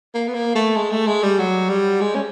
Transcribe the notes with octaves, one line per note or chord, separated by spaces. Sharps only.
A#3
B3
A#3
A3
G#3
A3
G#3
G3
F#3
G3
G#3
C#4